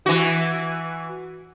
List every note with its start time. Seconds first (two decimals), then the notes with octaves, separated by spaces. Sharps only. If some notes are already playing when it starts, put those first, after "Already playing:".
0.06 E3 F#4